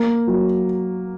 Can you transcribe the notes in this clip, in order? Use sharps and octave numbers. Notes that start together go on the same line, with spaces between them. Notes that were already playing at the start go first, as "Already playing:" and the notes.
Already playing: A#3
F#3